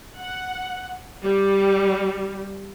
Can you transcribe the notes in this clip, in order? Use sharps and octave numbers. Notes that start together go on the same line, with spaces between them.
F#5
G3